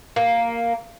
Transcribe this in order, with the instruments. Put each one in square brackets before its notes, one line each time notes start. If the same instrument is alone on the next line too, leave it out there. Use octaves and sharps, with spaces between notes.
[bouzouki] A#3